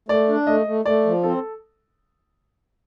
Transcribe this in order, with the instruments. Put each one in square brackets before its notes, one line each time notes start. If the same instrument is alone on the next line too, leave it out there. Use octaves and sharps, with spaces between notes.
[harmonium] A3 [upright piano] D5
[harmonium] D4
[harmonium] A3 [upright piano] D#5
[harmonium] A3
[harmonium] A3 [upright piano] D5
[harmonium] F3
[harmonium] C4 [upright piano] A4